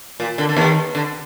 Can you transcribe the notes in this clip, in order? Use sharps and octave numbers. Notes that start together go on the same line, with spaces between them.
A#2
D3
D3
D#2 D#3
D3